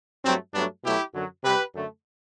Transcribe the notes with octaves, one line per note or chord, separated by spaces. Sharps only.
G2 F#3 A3 C4
G2 F#3 A3 B3 D4
B2 F#3 A3 E4 G4
F#2 D3 F#3
C3 G3 G4 B4
F#2 D3 A3